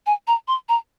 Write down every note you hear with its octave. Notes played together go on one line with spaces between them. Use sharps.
G#5
A#5
C6
A#5